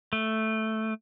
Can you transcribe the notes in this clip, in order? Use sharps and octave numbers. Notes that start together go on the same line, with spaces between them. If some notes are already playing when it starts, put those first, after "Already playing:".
A3